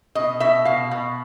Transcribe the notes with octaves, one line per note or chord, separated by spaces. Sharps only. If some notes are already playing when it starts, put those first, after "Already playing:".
B2 D#5
B2 E5
B2 F5
B2